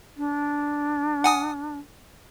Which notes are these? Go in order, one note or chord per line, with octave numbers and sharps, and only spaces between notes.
D4
F#5 G#5 D#6